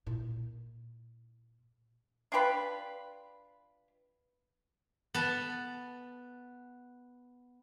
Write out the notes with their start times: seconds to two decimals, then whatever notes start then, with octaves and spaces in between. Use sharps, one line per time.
0.07 A#2 E4
2.32 D4 F4 G4 B4
5.14 B3 A5